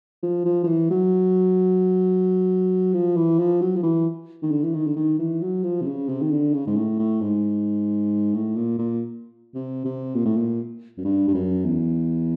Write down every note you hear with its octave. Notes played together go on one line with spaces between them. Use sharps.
F3
F3
F3
E3
F#3
F3
E3
F3
F#3
F3
E3
D#3
D3
E3
D#3
D3
D#3
E3
F#3
F3
C3
C#3
C3
D#3
D3
C#3
G#2
A2
A2
G#2
A2
A#2
A#2
C3
C3
A#2
A2
A#2
F#2
G2
G2
F#2
E2